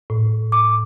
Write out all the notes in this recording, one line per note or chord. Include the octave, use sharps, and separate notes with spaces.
A2
D6